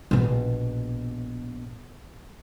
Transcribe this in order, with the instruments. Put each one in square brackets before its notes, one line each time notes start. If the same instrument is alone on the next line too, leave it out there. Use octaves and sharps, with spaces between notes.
[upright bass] A#1 B2